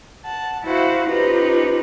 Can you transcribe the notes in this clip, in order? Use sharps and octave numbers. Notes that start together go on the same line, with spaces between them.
F#5 A5
E4 F#4 C5 F5 F#5
C#4 D#4 F4 G4 B4 C5